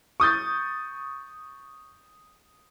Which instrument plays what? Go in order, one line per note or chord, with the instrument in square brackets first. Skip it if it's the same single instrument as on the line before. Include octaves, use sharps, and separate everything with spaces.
[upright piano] C#6 D#6 G6 A6